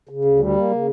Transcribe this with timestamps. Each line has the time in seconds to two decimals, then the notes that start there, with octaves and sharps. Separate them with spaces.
0.09 C#3
0.25 D2
0.40 G3
0.56 A#3
0.71 C#3